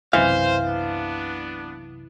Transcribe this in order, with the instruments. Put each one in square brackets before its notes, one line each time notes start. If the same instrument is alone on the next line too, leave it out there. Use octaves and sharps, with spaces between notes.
[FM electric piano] B1 F#2 C3 [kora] E3 [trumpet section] C5 [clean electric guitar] F5
[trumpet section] B3 D4